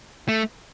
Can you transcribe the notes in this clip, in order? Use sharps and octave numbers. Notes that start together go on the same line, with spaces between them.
A3